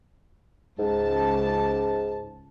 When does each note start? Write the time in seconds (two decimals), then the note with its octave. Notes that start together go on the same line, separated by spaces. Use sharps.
0.79 C#2 G#2 A5